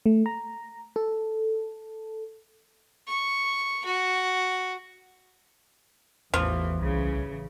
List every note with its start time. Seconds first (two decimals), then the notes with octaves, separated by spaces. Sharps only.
0.06 A3
0.26 A#5
0.96 A4
3.07 C#6
3.85 F#4
6.34 A1 E2 E3 F3
6.81 C2 C#3 E3